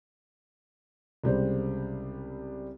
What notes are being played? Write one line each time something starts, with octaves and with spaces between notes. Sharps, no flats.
C2 C#3 G3 G#3 C5